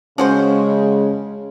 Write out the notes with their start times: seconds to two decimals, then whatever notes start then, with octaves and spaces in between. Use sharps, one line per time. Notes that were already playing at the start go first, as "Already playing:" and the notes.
0.18 C#3 F3 G#3 C#4 F#4 C5 C#5 G#5